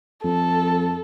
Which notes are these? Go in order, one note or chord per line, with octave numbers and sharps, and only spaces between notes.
F2 A4